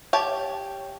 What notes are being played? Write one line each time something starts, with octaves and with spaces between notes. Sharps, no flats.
G4 C#5 A5